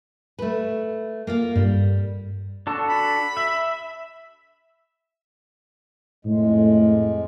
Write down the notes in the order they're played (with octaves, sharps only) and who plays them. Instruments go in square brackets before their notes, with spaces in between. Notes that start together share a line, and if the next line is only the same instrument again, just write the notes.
[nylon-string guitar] A3 B4
A#3 F4 F5
[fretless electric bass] G2 [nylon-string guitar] G3
[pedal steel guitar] D4 F#4 A4
[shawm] B5
[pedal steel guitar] E5
[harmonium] F2 G#3 [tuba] A2